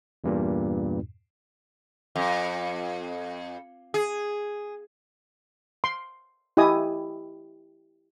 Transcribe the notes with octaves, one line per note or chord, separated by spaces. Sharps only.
E2 G2 A#2
F2
G#4
C6
E4 G4 D#5 G#5 D#6